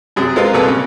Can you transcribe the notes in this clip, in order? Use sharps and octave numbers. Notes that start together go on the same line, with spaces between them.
F#2 C3 G#4
G#3 C4 F4 A#4 B4 F5
C2 A#2 A#3 G#4 A4 B4
C#3